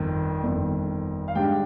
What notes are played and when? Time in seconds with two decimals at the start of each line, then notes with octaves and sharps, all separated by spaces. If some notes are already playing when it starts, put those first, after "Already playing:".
Already playing: G1 F2 D#3
0.43 G1 F2 D#3
1.28 F5
1.35 G#2 G3 D4 G5